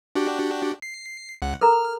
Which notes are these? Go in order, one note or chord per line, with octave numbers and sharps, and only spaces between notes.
D4 F#4 G4
C7
C#2 F#5
A4 A#4 A#5 F6